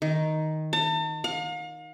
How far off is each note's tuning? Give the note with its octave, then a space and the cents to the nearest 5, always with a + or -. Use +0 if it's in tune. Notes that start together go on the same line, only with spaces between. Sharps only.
D#3 +5
A5 +40
F5 +40